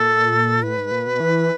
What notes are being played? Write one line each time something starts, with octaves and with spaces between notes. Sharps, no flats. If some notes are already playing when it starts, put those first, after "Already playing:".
Already playing: A#2 A4
A2 B4
G#2
A#2
B2
E3